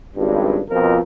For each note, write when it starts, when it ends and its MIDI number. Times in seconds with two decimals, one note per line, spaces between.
0.16 0.60 32
0.16 0.60 37
0.16 0.60 43
0.70 0.99 41
0.70 0.99 47
0.70 0.99 53
0.70 0.99 70